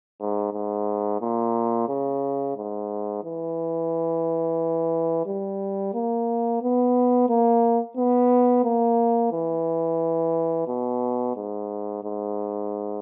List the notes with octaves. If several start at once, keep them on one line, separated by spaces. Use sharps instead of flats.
G#2
G#2
A#2
C#3
G#2
E3
G3
A#3
B3
A#3
B3
A#3
E3
B2
G#2
G#2